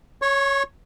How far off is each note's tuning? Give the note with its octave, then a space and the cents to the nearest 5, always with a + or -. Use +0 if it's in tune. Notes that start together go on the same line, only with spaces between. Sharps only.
C#5 +0 C#6 -30